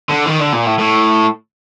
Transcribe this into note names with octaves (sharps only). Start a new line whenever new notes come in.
D3
D#3
D3
A#2
A2
A2